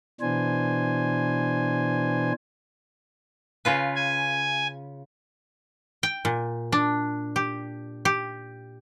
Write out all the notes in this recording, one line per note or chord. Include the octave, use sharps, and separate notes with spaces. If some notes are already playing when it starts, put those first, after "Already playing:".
B2 E3 D4 C5 G#5
C#3 F4 B4
G#5
G5
A#2
D4
G4
G4